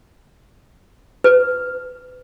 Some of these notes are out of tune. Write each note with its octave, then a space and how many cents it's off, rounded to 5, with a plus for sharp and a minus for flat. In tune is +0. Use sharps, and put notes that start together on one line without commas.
B4 +30